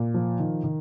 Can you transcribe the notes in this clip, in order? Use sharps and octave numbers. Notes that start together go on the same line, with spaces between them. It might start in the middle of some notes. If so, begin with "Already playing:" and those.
Already playing: A#2
F3
D#3
D#3